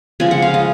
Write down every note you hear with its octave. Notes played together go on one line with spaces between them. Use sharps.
C#3 F3 G#3 G#5
F#5
F5
D#5